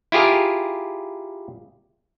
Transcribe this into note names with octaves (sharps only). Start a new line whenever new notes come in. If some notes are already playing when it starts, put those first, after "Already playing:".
E4 F4 G4 G#4 A#4